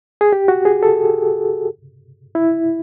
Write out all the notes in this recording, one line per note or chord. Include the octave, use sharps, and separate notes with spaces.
G#4
G4
F#4
G#4
A4
E4